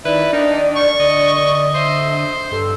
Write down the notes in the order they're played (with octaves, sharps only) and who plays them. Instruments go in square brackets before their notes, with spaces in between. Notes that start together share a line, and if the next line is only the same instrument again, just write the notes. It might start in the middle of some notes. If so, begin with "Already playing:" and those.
[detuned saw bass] D#3 [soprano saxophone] E4 [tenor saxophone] B4 [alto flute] D5
[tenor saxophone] D#3 [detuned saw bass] D4 [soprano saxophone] D#4
[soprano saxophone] C#6
[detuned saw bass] D3 [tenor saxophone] D#5
[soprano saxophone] C5 [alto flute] E5
[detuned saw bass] G2 [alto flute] A4